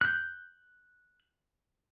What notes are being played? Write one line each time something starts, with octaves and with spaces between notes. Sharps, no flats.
F#6 G6